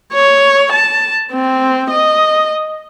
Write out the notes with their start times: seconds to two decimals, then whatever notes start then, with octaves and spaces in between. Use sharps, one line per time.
0.13 C#5
0.73 A5
1.33 C4
1.91 D#5